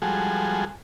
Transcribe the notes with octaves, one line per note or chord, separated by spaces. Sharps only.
F3 G3 G#3 F#4 G#4 A4